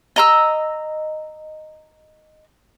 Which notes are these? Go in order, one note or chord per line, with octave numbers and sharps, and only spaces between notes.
D#5 A#5 E6